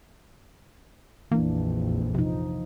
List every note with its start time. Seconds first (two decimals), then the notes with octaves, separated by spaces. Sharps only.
1.32 A#1 F2 E3 A#3 D4
2.15 C3 F3 D#4